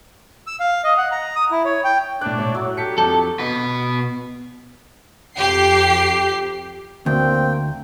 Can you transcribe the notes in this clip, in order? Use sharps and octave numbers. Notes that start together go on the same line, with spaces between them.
E6
F5
D#5
F#5
A#5
D#6
E4
C#5
G5
A2 D4 D5 F#6
A2 C#5
F#3
G4 A4 B6 C#7
F2 D4 G4 A4
B2 B4
F2 G4 C7
D2 A#3 C4 G5